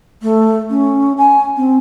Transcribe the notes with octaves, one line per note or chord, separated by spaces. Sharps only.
A3
C#4
G#5
C4